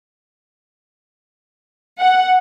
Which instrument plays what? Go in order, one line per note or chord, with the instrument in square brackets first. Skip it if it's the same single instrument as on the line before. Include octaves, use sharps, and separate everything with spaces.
[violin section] F#5